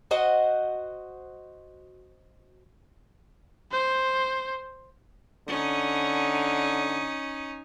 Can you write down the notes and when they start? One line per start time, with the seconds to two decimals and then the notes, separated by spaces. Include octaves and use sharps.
0.11 F#4 C5 D#5 F#5
3.72 C5
5.48 D3 C#4 D#4